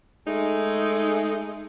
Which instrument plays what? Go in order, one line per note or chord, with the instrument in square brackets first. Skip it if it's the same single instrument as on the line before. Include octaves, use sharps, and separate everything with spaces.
[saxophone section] G#3 A3 D#4